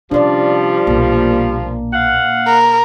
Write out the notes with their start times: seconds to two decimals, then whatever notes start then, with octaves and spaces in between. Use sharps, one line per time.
0.11 C3 F3 G3 C#4 D4 D5
0.87 B1 A#2 A#3
1.93 F5 F#5
2.47 A#4